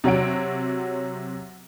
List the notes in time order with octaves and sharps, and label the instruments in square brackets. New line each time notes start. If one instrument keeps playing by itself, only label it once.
[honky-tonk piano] C3 F#3 C#5 F#5 D7